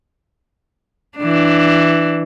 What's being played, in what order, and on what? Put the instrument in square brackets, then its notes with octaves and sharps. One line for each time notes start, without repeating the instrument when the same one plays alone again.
[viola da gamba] E3 D4